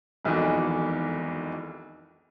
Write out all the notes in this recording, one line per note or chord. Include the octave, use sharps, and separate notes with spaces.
E1 B1 F2 D#3 E3 F#4